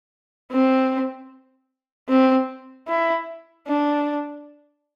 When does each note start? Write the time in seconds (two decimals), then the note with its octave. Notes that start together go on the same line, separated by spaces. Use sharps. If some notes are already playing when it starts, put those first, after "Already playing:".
0.51 C4
2.09 C4
2.88 E4
3.67 D4